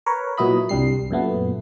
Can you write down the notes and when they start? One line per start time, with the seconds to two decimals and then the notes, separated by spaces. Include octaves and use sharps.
0.06 A#4 B4 C#5
0.37 A#2 F#3 B3 E4 D#5 B5
0.69 C2 G2 G3 C7
1.11 F#2 A#2 A3 B3